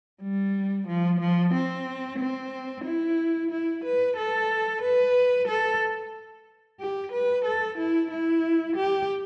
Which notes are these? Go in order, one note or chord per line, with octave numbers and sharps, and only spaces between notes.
G3
F3
F3
C4
C4
E4
E4
B4
A4
B4
A4
G4
B4
A4
E4
E4
G4